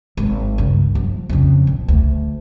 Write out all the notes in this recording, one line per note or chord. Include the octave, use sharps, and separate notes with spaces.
G#1
C#2 G2
F3
F2 C#3
A#2
D2